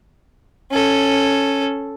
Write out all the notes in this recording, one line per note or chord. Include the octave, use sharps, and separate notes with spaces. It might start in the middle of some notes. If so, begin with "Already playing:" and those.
C#4 A4